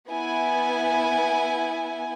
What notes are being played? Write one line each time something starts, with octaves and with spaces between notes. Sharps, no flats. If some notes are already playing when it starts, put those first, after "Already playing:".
B3 E4 G#5